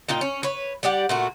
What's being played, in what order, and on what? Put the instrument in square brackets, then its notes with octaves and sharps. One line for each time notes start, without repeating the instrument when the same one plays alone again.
[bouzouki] A#2 D#4 F4 G5
C#4
B4 C#5
G3 G4 D5 F#5
A#2 A3 F#4